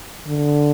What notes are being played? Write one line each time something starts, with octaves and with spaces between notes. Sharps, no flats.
D3